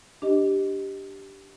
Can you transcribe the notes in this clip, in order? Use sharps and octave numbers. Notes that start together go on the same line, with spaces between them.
D4 G4 D#5